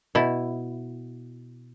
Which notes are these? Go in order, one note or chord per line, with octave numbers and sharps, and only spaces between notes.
B2 E4